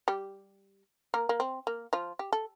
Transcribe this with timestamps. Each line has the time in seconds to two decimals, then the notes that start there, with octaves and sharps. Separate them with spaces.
0.08 G3 G4
1.14 A#3 A#4
1.29 A#3
1.40 C4
1.67 A#3
1.93 F3 F4
2.19 G4
2.33 A4